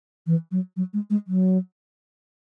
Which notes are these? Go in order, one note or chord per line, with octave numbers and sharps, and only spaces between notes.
E3
F#3
F#3
G#3
G#3
F#3